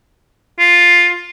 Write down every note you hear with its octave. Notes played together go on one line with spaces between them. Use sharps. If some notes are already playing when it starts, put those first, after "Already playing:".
F4